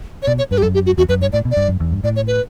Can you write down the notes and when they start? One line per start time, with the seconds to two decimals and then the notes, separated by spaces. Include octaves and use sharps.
0.22 C#5
0.27 B2 D5
0.39 C#5
0.51 G2 B4
0.58 G4
0.63 F#2 A4
0.74 G4
0.86 F#4
0.98 E2 F#4
1.09 F#2 B4
1.21 G2 C#5
1.33 A2 D5
1.45 B2
1.51 D5
1.57 G2
1.68 F#2
1.80 E2
1.92 G2
2.04 A2 D5
2.16 C#5
2.27 B4